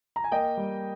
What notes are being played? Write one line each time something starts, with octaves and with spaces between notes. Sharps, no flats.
A#5
G#5
A#3 D#5 G5
G3